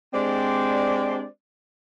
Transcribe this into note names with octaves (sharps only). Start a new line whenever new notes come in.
G#3 C4 D4 G4 C5 D5